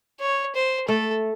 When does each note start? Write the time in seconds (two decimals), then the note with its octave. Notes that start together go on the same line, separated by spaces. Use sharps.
0.21 C#5
0.55 C5
0.88 A3 A4